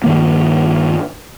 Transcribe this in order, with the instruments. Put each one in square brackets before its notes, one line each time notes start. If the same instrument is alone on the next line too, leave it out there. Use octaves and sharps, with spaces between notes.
[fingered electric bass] G2 D#3 A#3